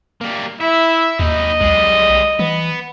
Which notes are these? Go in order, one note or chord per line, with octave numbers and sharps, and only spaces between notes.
G3 A#3
E4 E5
D#2 D#4 B4 D#5
B1 G3 G#3
E3 B3